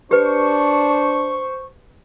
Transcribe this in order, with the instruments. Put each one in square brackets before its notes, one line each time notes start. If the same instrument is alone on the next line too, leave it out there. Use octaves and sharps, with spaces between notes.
[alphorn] D4 [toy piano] G4 B4 [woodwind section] C5 C#6